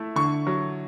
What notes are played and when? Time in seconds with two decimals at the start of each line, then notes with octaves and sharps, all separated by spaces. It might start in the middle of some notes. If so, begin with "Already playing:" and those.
Already playing: A3 E4
0.16 D3 C#6
0.47 F#3